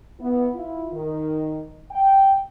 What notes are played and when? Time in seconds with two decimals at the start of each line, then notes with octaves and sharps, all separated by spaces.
0.20 B3 E4
0.54 E4 F4
0.93 D#3
1.91 G5